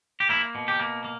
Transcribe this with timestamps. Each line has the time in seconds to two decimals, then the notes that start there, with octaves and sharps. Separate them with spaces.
0.20 G4
0.29 A#3 E4
0.55 B2
0.68 G4
0.79 A#3
1.04 A#3